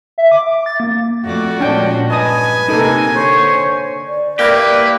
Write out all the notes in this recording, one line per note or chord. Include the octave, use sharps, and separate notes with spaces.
E5
D6
D6
A6
A#3
F2 A3 F#4 D5
A#2 F3 G#3 C#4 D4 G5
G2 B4 D#5 G#5 A5 D#6
C3 A#3 D#4 A4
D3 C5 C#5
D5
A#3 E4 G4 B4